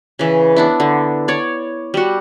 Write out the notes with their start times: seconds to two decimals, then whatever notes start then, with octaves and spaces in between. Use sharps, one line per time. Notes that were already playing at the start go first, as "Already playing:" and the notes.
0.19 C#3 E3
0.56 B3 D4 E4
0.80 D3
1.28 C#5 D5
1.94 G3 F#4